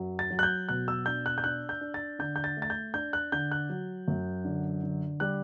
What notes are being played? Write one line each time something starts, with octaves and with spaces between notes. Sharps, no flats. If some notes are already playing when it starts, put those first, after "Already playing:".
Already playing: F#2 F#3
A6
F#3
F#6
G6
B2 F#6
E6
D4 G6
F#6
G6
D4 F#6
G6
D4
A6
D3 G6
G6
A6
A3
A6
G6
D4 G6
F#6
D3 G6
F#6
F#3
F#2
D3
D3
G3 F#6